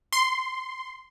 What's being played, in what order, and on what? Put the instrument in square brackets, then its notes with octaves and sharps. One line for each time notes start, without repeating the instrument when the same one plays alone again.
[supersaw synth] C6